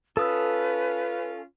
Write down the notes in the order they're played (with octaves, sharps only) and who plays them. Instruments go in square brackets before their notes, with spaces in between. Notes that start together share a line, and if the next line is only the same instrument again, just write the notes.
[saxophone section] C#4 F4 [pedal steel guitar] A4 D#6 E6 [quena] B4